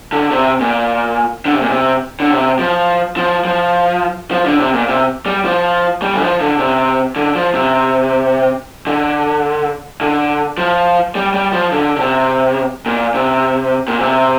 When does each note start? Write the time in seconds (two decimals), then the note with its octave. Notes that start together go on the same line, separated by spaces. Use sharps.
0.12 D3
0.31 C3
0.60 A#2
1.45 D3
1.53 C3
1.62 A#2
1.69 C3
2.20 D3
2.30 C3
2.59 F3
3.17 F3
3.45 F3
4.31 F3
4.45 D3
4.59 C3
4.73 A#2
4.88 C3
5.26 G3
5.45 F3
6.02 G3
6.14 D3
6.21 F3
6.40 D3
6.59 C3
7.16 D3
7.35 F3
7.54 C3
8.87 D3
10.01 D3
10.57 F3
11.15 G3
11.34 G3
11.53 F3
11.72 D3
11.96 D3
12.00 C3
12.86 A#2
13.14 C3
13.88 A#2
14.00 C3